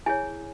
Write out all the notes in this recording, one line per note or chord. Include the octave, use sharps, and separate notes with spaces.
E4 G#4 C#5 G#5